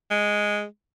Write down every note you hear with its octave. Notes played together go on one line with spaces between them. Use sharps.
G#3